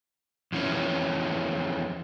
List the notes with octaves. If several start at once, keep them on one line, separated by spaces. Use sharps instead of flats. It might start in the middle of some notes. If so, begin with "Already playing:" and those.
F2 E3 C#4